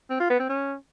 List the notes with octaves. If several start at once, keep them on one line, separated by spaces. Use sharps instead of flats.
C4
F4
B3
C4
C#4